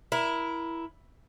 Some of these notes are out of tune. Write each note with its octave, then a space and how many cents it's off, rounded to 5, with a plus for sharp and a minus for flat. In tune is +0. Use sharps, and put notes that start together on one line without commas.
E4 +5 A#4 +25